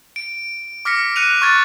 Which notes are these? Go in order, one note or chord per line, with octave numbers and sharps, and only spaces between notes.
D7
D6 F6 A#6 B6 C#7
F#6 C#7 D#7 F7
C#6 F6 F#6 G#6 A6